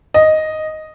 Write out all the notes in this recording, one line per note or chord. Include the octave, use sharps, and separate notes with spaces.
D#5